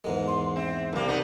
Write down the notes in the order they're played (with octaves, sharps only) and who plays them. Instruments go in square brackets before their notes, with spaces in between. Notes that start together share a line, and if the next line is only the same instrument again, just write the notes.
[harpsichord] E2 G#2 G#3 [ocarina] A#4
[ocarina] C6
[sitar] C4 [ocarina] E5
[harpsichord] C2 D4 [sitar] G2 A#3
[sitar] B3 D#4 [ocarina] F#5